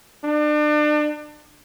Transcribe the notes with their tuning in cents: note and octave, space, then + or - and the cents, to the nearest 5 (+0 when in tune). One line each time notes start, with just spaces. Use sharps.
D4 +35